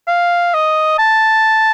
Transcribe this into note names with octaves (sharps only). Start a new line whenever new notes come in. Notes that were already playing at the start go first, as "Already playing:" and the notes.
F5
D#5
A5